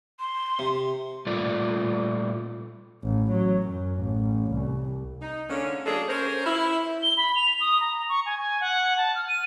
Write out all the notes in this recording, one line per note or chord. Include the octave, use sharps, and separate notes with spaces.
C6
C3
A#2 G3 A3 F4 D5
A1
F#3
F#2
A1
C2
D#4
D3 G#3 A#3 C#4
F#3 A#3 D4 G#4 A4 D#5
C#4 A#4 C5
E4
G7
B5
F7
D#6
A#5
C#6
G#5
G#5
F#5
A5
F6
D#7